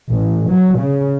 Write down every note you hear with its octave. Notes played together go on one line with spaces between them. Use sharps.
A1
F#3
C#3